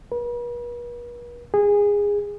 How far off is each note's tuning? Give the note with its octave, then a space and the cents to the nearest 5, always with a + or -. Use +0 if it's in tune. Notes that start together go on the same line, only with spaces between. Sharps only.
B4 -45
G#4 -20